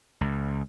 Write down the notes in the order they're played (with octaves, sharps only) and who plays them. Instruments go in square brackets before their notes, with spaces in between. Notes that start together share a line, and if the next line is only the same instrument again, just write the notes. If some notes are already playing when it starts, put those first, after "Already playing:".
[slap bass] C#2